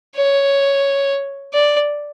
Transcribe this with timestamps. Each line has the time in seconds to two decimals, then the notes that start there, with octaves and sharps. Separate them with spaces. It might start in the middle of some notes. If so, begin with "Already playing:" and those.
0.16 C#5
1.53 D5